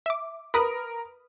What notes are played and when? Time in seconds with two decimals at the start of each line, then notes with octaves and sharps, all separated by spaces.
0.06 E5 D6
0.54 A#4 B4 B5 D#6